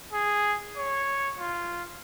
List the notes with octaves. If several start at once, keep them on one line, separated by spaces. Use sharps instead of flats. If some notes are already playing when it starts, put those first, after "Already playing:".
G#4
C#5
F4